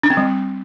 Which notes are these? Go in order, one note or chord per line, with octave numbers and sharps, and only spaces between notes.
D4
C4
G3